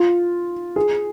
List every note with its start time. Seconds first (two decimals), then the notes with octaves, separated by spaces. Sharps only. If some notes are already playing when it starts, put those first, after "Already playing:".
Already playing: F4
0.76 G#4